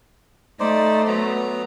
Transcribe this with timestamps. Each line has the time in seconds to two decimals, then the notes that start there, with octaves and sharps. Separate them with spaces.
0.60 A3 D#4 C5 D5
1.07 F#3 B3 A#5